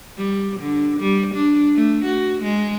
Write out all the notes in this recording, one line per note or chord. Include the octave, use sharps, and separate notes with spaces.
G3
D3
G3
D4
A3
F#4
G#3